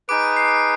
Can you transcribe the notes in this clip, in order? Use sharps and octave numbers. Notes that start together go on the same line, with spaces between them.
D#4 G#4 B4 D6 D7
C7